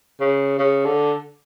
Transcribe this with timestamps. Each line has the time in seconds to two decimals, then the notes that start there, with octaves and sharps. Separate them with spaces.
0.20 C#3
0.59 C#3
0.85 D3